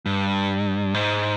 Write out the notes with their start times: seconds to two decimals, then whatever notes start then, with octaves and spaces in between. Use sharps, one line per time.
0.06 G2
0.94 G#2